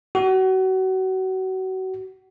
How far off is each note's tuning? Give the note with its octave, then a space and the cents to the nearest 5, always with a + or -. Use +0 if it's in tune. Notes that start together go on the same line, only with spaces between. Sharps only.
F#4 +30